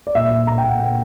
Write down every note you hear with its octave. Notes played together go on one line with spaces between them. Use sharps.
D5
A#2 E5
A#2
A#2 A#5
G5
A#2
F#5
A#2 G5